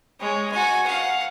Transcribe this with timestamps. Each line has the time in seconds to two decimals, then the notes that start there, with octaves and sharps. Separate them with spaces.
0.21 G#3 C#5
0.51 F#4 G#5
0.87 F5 F#5